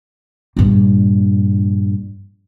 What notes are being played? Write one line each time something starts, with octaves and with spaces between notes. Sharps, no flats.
A#1 G2